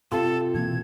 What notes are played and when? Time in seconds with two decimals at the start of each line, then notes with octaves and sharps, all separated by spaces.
0.12 C3 F4 A4
0.55 B2 E3 A#3 G#6